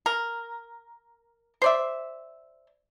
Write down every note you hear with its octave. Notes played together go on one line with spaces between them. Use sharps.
A#4
C5 D5 E5